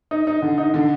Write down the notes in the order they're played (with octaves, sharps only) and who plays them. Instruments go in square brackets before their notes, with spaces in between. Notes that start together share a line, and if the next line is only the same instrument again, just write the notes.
[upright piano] D#4
D#4
D3
D#4
D3